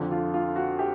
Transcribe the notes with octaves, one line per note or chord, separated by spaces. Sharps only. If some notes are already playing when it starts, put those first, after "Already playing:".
Already playing: F2 D3 F3
F4
F4
F#4
G4